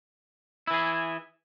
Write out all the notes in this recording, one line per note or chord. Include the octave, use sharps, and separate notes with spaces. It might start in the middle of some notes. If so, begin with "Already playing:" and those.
E3 E4 G#4